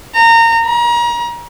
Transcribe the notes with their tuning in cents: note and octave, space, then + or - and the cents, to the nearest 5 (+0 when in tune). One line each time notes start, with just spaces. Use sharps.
A#5 -25
A#5 +35